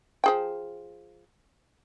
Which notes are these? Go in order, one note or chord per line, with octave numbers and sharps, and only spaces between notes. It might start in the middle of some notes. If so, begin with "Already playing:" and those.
F3 G#4 G5